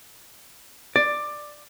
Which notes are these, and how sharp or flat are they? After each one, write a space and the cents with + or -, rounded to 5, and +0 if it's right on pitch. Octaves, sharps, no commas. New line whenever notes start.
D5 +10